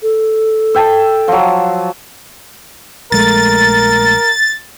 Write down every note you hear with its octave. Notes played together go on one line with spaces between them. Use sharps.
A4
E5 G5 A5
F3 F#3
A#1 G#3 A3 A#4 A6